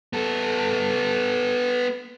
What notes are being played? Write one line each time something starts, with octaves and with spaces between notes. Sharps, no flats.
B3 A4